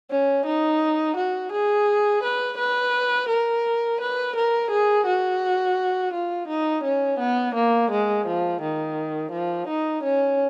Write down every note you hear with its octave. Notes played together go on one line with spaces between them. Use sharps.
C#4
D#4
F#4
G#4
B4
B4
A#4
B4
A#4
G#4
F#4
F4
D#4
C#4
B3
A#3
G#3
F3
D#3
F3
D#4
C#4